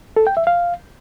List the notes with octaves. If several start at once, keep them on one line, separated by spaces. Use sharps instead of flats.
A4
G5
E5
F5